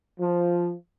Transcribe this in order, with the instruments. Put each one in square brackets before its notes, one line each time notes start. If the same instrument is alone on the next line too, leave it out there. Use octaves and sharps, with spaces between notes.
[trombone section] F3